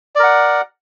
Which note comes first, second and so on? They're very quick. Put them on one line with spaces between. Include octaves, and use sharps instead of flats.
D5 A#4 F#5